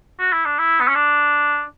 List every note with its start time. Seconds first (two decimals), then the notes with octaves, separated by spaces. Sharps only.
0.20 F#4
0.33 E4
0.45 D4
0.58 E4
0.80 B3
0.88 C#4
0.95 D4